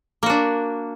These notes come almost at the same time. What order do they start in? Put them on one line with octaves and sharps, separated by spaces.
A#3 F#4 D4